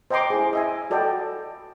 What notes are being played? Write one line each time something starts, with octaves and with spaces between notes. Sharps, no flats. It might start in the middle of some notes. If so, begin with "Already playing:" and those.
C5 D#5 G5 A#5 C6 D6
E4 G#4
D#5 E5 G#5
F#4 A4 D5 D#5 G5